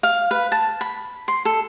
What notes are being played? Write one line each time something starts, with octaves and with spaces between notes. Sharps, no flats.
F5
B4
A5
B5
C6
A4